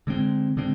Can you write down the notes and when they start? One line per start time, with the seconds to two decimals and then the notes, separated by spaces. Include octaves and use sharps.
0.07 D3 G#3 C4
0.57 D3 G#3 C4